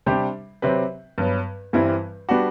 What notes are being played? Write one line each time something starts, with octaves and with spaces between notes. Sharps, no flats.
C3 G3 D4 G4 C5
C3 F#3 C4 G4 B4
G2 F#3 B3
G2 E3 G3 C4 E4
G3 B3 D4 F#4